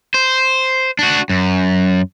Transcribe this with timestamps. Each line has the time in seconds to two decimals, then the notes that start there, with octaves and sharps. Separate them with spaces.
0.14 C5
0.99 D4 F#4
1.29 F#2